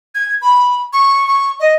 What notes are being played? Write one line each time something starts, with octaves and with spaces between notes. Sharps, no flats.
G#6
B5
C#6
C#6
D#5